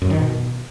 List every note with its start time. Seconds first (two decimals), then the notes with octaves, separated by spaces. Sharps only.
0.02 F#2
0.10 D#3
0.19 B2